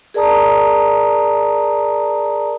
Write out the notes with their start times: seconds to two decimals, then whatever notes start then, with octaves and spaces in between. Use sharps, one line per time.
0.14 G#4 A#4 D5 A5 A#5 D#6